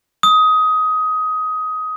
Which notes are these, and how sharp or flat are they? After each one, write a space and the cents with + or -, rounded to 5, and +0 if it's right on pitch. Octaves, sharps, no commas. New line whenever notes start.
D#6 +15